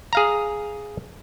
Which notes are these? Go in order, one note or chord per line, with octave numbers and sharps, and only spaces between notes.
G#4 F5 A#5